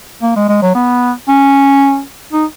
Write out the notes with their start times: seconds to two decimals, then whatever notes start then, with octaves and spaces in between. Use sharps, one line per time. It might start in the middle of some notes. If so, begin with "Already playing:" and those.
0.22 A#3
0.36 G#3
0.48 G#3
0.62 F#3
0.75 B3
1.28 C#4
2.32 D#4